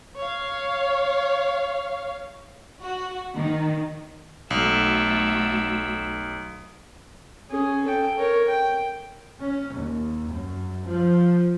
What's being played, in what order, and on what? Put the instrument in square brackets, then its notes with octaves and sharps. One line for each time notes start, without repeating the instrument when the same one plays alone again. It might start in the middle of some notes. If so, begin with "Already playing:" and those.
[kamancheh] C#5 F5
[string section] F#4
D#3
[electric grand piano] B1 [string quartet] A3 F#4 E6
[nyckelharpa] C#4 G#4
A4 G5
A#4 C#5
G5
[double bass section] C#4
D#2
F#2
F3